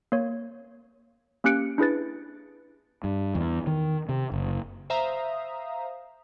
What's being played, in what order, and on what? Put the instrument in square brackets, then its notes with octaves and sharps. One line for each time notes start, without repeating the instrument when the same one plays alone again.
[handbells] A#3 C#5
A#3 C#4 G4 F#6 C#7 D7
D4 E4 G#4 B4 A6
[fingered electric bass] G2
E2
D#3
C3
F#1
[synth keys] C5 E5 F5 A#5 D#6